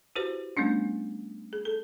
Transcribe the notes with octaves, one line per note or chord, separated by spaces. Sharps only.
E4 F#4 G4 B4 C5
G3 A3 B3 C#4 D4
G#4
A4